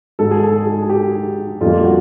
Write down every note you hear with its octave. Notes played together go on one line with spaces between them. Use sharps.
G#2 D#3 G#3 A4
G#4
A4
G#4
G#4
G4
F2 D3 G3 A#3 F4
F#4